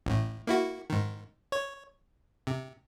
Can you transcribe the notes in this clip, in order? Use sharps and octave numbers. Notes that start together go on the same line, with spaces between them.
A1 A2
A#3 E4 F#4
G#2 D#3
C#5
C3